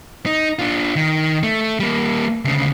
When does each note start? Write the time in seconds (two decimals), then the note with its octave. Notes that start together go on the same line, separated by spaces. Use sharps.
0.26 D#4
0.59 D4 F4
0.96 D#3
1.43 A3
1.80 G3 A#3
2.45 D2 C#3